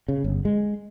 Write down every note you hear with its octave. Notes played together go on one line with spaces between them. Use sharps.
C#3
G1
G#3